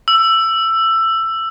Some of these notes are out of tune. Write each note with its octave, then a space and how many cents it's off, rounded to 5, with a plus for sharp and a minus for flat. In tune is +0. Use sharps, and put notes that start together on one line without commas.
E6 +15